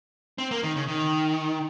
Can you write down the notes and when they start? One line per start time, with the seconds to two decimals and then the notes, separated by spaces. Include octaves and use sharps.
0.38 C4
0.51 A#3
0.63 D#3
0.76 C#3
0.88 D#3